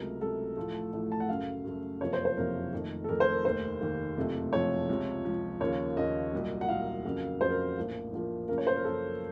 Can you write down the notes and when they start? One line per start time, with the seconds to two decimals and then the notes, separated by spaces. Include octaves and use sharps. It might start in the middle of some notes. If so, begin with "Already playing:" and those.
Already playing: C#2 C3 F#3 A3 A#4
0.21 C#2 C3 F#3 A3 A4
0.56 A1 A2 F3 A3
0.93 A1 A2 F3 A3
1.12 A5
1.20 F#5
1.28 F#2 C#3 F#3 A3 F5
1.65 F#2 C#3 F#3 A3
2.01 F#1 F2 C3 F3 A#3 C#5
2.13 C5
2.25 C5
2.37 F#1 F2 C3 F3 A#3 A#4
2.73 F2 D#3 A3
3.04 A4
3.09 F2 D#3 A3 A#4
3.20 C5
3.33 A#4
3.45 F1 D#2 D#3 A#3 C5
3.81 F1 D#2 D#3 A#3
4.17 F#1 F2 C3 F3 A3
4.53 F#1 F2 C3 F3 A3 C#5
4.89 C#2 C3 F3
5.25 C#2 C3 F3
5.60 D#2 C#3 F3 A#3 C#5
5.97 D#2 C#3 F3 A#3 D#5
6.33 C2 A#2 F#3
6.61 F#5
6.68 C2 A#2 F#3 F5
7.05 F2 C#3 F#3 A#3
7.41 F2 C#3 F#3 A#3 C5
7.50 A#4
7.77 A#1 A2 F3 A#3
8.13 A#1 A2 F3 A#3
8.48 F#2 C#3 F3 A#3 A#4
8.58 C#5
8.67 C5
8.76 A#4
8.84 F#2 C#3 F3 A#3 A4